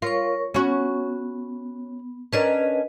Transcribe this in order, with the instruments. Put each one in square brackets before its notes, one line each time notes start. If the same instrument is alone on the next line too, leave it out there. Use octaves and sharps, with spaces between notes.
[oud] F4 [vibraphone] A#4 C#5 C#6
[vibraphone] B3 [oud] C#4 F#4
[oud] C#4 D4 A#4 [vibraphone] B4 D#5